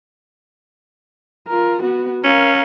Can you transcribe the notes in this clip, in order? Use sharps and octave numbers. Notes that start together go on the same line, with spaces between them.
F4 A#4
B3 F#4
C#4 A#4 F5